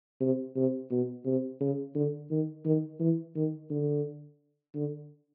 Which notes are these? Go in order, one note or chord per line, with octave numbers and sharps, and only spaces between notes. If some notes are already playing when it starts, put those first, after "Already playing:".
C3
C3
B2
C3
C#3
D3
D#3
D#3
E3
D#3
D3
D3